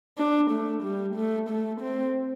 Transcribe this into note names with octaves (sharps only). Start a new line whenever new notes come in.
D4
A3
G3
A3
A3
C4